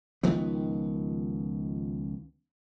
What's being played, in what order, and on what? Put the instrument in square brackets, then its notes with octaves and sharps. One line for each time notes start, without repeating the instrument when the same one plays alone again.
[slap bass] C#2 D#3 F3 B3